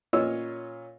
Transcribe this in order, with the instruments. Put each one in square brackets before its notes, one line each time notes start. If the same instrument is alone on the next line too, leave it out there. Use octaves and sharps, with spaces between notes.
[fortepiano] A#2 C#4 F4 C#5 D#5 E6